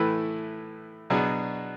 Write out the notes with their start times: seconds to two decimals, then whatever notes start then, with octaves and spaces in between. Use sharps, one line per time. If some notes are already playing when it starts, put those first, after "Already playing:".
Already playing: A2 E3 A3 E4 B4
1.10 B2 F#3 B3 D4 G#4